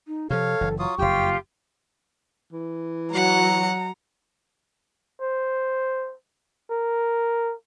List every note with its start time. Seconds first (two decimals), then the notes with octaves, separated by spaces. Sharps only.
0.08 D#4
0.30 C3 F3 A4 C#5 F5
0.61 F#1 E3
0.79 F#3 F4 C#6 D#6
0.98 F#1 F2 F4 G4 G5
2.53 E3
3.14 F#3 F#5 A#5
5.22 C5
6.71 A#4